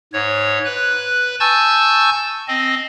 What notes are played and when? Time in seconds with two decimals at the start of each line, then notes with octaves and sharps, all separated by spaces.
0.13 G#2 C#5
0.65 B4 F#6
1.40 G#5 A5 C#6 E6 G6 A6
2.48 C4 D#5